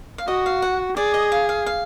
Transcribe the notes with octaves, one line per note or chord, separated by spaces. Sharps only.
F5
F#4 D#5
F5
F#5
G#4 D5
D#5
F5
F5
F5